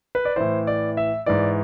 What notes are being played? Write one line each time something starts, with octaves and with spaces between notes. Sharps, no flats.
B4
D5
A2 E3 C5
D5
E5
G#2 E3 D5